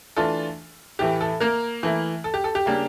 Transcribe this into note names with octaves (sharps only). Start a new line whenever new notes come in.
E3 A3 D4 F4 A4
A2 E3 A3 G4
A4
A#3 A#4
E3 A3 E4
A4
G4
A4
G4
C#3 G3 A#3 D4